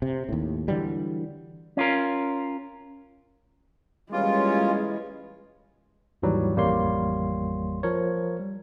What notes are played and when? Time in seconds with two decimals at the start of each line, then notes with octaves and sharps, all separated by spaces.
0.02 C3
0.29 D#2 A2
0.68 D3 E3 F#3 G3
1.77 C#4 F4 A#4
4.12 E3 G3 G#3 A#3 C#4 F4 D6
6.22 D#2 G#2 E3 F#3 G3
6.56 A1 F2 G3 A#3 C#5 C6
7.83 F3 A#4 C#5
8.40 G3